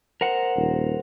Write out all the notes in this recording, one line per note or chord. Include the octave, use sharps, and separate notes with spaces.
A#4 C5 F#5
D#1